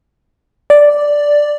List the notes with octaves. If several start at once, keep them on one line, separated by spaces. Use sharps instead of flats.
D5